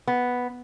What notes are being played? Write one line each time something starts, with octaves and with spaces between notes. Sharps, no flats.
B3